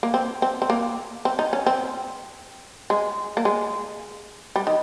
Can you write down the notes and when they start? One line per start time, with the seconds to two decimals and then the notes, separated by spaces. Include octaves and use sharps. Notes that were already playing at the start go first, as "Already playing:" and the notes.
0.03 A#3
0.14 C4
0.42 C4
0.62 C4
0.70 A#3
1.25 C4
1.39 D#4
1.53 C#4
1.67 C4
2.90 G#3
3.37 A#3
3.45 G#3
4.56 G3
4.67 D#3